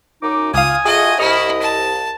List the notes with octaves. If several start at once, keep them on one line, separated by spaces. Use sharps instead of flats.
F#2 D#4 D6
C#2 F4 F5 G#5 D#6 F6
A3 F4 F#4 G#4 D#5
C2 E4 D#5 C#6 D#6 F6
A5